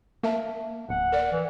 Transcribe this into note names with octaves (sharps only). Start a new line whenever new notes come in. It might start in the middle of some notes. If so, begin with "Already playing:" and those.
A#3 A#4 E5 A5
D1 F#5
A#4 D5
E3